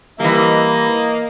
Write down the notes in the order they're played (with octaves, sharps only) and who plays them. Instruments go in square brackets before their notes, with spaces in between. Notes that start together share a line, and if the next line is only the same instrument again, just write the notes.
[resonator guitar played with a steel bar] E3 G3 [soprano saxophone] A#3 [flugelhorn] D#5